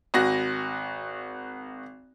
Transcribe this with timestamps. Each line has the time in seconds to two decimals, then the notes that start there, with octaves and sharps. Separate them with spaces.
0.14 G#1 F#4 A#6